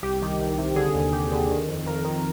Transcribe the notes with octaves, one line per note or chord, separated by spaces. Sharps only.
C2 G4
D#3
C2
C3
D3 G#4
D#2
D#2 G4
D3
D#3
F2
F2 A#4
D#3